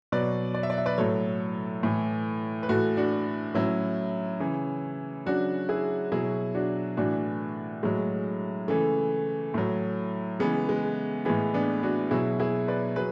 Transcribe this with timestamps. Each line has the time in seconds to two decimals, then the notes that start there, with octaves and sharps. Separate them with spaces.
0.12 B2 F#3 B4 D5
0.54 D5
0.63 E5
0.70 D5
0.78 E5
0.86 B4 D5
0.98 A2 F#3 A4 C#5
1.83 A2 E3
2.63 B4
2.69 A2 E3 F#4 A4
2.97 D4 F#4
3.54 A2 F#3 C#4 E4
4.40 C#3 E3
5.26 C#3 F#3 D4 F#4
5.69 E4 G#4
6.12 B2 F#3 E4 G#4
6.55 D4 F#4
6.97 A2 E3 D4 F#4
7.83 A2 F#3 G#3
8.68 C#3 E3 A3
9.54 A2 F#3
10.39 C#3 E3 G#3 B3
10.69 G#3
11.25 A2 E3 G#3 B3
11.54 B3 D4
11.83 D4 F#4
12.11 B2 F#3 E4 G#4
12.40 E4 G#4
12.68 B4 D5
12.96 F#3 G#4 B4